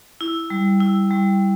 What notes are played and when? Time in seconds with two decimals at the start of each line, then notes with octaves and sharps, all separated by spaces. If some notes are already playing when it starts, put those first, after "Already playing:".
0.21 E4
0.50 G3
0.80 E4
1.11 G3